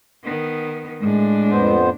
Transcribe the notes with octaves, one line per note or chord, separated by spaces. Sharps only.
D#3 B3
A2 G#3 D4
F2 B3 C5